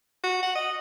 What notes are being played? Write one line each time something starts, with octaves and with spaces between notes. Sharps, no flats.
F#4
F#5
D#5